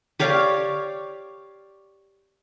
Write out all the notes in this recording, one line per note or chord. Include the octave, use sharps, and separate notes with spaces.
G4 C#5 D5 F5